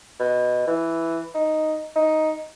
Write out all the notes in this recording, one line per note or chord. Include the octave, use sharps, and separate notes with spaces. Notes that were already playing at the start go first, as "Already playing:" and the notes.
B2
E3
D#4
D#4